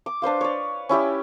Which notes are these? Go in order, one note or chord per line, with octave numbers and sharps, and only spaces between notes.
D6
D4 B4 C5 F5
C#5 D5
C#4 E4 G4 D5